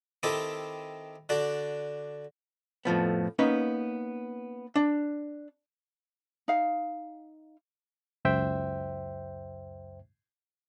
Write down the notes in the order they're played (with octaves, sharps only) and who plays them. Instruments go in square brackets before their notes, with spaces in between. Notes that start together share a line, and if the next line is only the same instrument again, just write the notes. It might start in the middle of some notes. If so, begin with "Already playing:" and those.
[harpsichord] D#3 C4 E4 G4 A4 D#5
D3 D4 F#4 D5
[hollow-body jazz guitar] F2 A2 F3 B3
A#3 B3 C#4 D#4 B4
D4
[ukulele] D#4 F5
[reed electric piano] C#2 F#2 C5 E5 G5